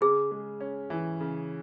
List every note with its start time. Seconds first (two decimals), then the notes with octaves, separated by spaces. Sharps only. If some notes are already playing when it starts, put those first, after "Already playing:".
0.01 C#3 G#4
0.31 G#3
0.60 C#4
0.90 E3
1.20 C#3